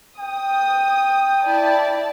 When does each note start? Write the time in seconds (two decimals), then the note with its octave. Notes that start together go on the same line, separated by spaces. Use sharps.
0.19 G5 D#6
1.45 E4 D5 A5